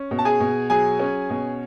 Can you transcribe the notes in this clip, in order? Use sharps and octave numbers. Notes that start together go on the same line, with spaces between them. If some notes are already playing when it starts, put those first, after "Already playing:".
Already playing: C#4
B2
A5
G#4 G#5
B2
F#3 G#4 G#5
C#4
B2